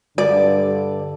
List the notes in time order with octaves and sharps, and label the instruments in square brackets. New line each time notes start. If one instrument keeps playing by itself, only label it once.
[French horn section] G2 D3 [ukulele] D5